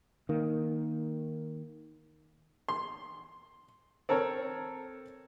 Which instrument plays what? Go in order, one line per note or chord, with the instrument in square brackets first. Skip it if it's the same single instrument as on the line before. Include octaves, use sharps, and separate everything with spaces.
[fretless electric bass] D#3 A#3
[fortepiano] C6
C4 A4 A#4 C#5